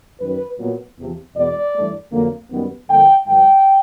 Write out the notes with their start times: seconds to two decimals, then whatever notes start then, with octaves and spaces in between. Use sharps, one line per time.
0.20 F#2 D#3 F#3 B4
0.59 A#2 F#3 B3
0.98 E2 C3 F3
1.35 E2 B2 G#3 B3 D5
1.74 G2 E3 A3
2.12 F2 D3 F#3 A#3
2.51 F#2 D#3 G3 B3
2.88 G2 D3 F3 A#3 G5
3.27 G#2 D#3 F#3 G5